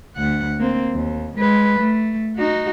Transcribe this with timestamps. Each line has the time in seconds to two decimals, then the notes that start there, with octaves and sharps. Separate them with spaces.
0.16 D2 F#5
0.59 A#3 C4
0.92 D#2
1.37 G#3 B4
1.78 A3
2.37 D#4 F#4